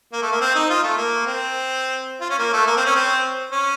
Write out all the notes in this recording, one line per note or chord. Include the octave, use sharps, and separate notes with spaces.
A#3
A3
A#3
C4
D#4
F4
A3
A#3
C4
F4
C#4
A#3
A3
A#3
C4
C#4
C4
C#4